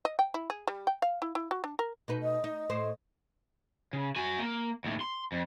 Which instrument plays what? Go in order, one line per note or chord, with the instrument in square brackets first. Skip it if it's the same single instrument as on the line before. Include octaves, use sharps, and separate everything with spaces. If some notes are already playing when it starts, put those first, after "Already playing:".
[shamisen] D#5
G5
E4
G#4
G3
G5
F5
E4
E4
F#4
D4
A#4
[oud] B2 D#4 B4
[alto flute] D#5
[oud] D#4
A2 C5
[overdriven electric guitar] C#3
F#4 G#5
A#3
D#2 A2
C6
F2